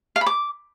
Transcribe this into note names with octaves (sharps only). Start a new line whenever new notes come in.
F5
B5
D6